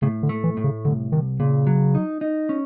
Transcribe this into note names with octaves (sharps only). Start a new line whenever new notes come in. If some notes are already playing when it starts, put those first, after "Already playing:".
A2 C#3
D3
A3
E3
A2
C#3
C2 D3
C2 D#3
A#2 C#3
F#3
D#4
D#4
C#4